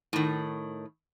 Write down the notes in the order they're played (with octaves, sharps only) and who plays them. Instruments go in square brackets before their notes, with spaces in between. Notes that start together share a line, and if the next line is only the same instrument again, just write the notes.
[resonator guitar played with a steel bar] A2 D#3